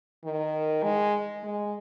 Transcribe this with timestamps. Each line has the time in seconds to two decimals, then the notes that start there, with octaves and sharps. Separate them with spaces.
0.24 D#3
0.83 G#3
1.43 G#3